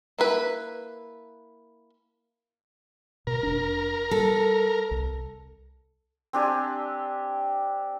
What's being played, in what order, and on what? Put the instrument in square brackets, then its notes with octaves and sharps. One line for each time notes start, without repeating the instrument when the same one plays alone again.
[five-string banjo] A#3 E4 B4
[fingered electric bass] B2 [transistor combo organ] A#4
[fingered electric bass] F1 D4
[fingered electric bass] G3 [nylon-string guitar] A4
[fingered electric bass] C2
[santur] C4 D4 G4 G#5